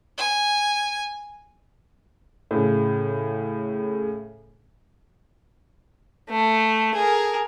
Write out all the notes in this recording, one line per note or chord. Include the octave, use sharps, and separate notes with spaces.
G#5
A2 C#3
A3
G#4 A#4